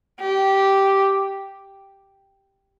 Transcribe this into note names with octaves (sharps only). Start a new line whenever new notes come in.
G4